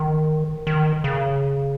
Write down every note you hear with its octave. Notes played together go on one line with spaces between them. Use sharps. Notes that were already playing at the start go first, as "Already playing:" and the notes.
Already playing: D#3
D#3
C#3